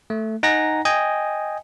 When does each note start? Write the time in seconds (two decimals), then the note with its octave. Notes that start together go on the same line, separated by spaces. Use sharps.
0.10 A3
0.43 D#4 F#5 G#5 A#5 A#6
0.85 D#5 G5 G#5